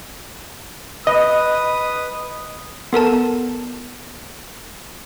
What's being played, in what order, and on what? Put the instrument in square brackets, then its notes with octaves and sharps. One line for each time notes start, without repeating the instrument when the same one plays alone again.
[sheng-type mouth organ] B4 [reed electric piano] D#5 [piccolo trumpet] D#6
[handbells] B3 A4 A#4 A5